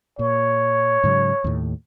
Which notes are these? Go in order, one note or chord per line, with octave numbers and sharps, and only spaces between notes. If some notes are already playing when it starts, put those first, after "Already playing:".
A#2 C#5
G#2 C#3 F#3
D#2 A2